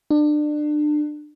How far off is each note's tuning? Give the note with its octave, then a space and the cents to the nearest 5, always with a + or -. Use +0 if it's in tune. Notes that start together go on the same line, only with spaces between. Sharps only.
D4 +30